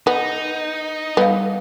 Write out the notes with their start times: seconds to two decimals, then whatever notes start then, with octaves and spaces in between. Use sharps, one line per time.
0.07 B3 D#4
1.17 G3 B3 B4 F5